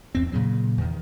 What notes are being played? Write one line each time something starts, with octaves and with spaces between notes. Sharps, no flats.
E2 C4
A#2 C#3 F#3
E2 D#3